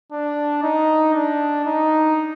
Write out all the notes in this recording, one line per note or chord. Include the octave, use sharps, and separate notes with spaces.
D4
D#4
D4
D#4